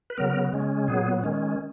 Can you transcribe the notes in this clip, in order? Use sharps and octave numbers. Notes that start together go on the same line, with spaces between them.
B4
C#3 F#3 B3 A#4
C#3 G#3 C#4
A#2 F#3 B3 G#4
D#3 G#3 C#4